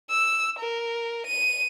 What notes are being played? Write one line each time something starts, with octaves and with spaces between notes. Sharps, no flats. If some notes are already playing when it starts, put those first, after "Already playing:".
E6
A#4
D#7